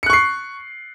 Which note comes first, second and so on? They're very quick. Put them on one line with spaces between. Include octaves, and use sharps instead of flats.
C#7 F#6 C#6 C7